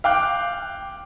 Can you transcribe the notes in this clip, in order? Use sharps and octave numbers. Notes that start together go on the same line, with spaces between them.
F5 G5 D6 F#6